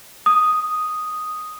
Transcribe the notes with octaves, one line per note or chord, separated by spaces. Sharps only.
D#6